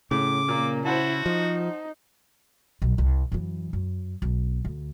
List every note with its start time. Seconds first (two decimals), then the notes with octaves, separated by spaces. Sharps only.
0.11 A2 C#3 D6
0.49 A#2 A#3
0.85 E4 F#4 C5 F#5 A5
1.26 F3 D#4
2.82 B1
2.98 C2
3.32 F#2 E3
3.73 F#2
4.22 B1
4.65 D2